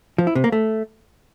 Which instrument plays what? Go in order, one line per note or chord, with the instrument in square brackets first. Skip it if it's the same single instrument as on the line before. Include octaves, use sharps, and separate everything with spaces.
[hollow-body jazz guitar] F3
E4
C3
A#3
A3